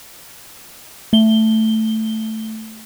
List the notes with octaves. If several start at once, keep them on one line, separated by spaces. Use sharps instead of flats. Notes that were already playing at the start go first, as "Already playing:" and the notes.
A3 G7